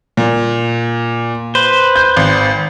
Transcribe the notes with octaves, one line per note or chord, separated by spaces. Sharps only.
A#2
B4 C5
G6
G#1